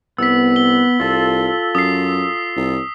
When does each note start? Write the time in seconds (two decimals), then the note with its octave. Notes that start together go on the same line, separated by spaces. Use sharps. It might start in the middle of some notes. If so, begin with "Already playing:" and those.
0.18 C2 B3 E6 B6
0.56 G7
1.00 C2 F4 A4
1.75 F#2 D#6 C7
2.56 C2